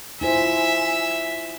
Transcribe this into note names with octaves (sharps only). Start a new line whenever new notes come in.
E4 F4 C5 E5 G#5